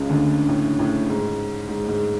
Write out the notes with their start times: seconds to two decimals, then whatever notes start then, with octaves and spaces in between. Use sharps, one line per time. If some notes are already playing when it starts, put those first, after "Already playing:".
Already playing: C#2 C#3
0.09 D2 D3
0.49 A2
0.79 A2
1.09 G#2
1.69 G#2
1.88 G#2